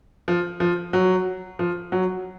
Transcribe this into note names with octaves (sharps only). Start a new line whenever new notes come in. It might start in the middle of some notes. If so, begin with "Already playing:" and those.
F3
F3
F#3
F3
F#3